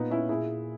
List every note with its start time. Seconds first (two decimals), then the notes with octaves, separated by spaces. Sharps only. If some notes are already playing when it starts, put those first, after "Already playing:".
Already playing: A#2 B3 D#4
0.10 C#4 E4
0.29 A#2 E4 G#4